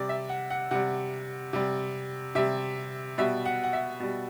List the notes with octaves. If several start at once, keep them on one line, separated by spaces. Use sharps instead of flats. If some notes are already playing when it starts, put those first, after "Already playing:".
Already playing: C3 G3 D5
E5
F#5
F#5
C3 G3 F#5
C3 G3
C3 G3 E5
B2 G3 E5
F#5
F#5
E5
B2 G3